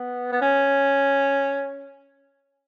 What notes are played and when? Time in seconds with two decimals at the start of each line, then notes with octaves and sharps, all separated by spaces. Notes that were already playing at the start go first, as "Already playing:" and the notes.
Already playing: B3
0.32 B3
0.41 C#4